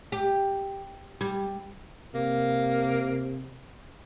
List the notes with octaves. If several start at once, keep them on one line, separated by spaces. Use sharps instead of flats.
G4
G3
C3 A#3